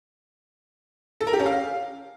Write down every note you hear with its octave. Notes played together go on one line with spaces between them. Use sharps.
A4
A#4
G4
C#4
F5